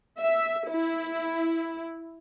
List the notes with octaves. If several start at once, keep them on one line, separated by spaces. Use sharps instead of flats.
E5
E4